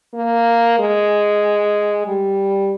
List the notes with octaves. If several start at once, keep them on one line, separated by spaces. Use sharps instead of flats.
A#3
G#3
G3